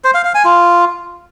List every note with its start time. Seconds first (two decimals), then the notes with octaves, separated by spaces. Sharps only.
0.04 C5
0.14 F5
0.25 F5
0.35 G#5
0.45 F4